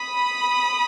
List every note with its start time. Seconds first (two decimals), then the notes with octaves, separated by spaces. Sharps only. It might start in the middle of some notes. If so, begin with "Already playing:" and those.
Already playing: B5 D#6